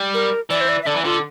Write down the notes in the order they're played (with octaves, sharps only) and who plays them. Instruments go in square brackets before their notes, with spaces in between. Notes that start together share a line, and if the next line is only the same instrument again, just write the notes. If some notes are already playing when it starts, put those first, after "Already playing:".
Already playing: [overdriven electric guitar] G3
[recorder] A#4
[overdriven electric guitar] E3 [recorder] D5
[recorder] C5
D5
E5
[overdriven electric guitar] D3 [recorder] D5
[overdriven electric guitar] E3
[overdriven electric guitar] D3 [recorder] F4